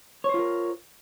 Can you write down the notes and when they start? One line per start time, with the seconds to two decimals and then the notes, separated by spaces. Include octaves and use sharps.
0.24 C#5
0.29 C5
0.34 F4
0.39 A#4